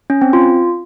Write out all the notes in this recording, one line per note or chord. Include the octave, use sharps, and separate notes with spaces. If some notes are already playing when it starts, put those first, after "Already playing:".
C#4
C4
F4